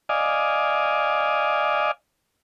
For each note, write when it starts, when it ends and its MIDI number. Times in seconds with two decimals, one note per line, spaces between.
0.09 1.91 74
0.09 1.91 75
0.09 1.91 77
0.09 1.91 80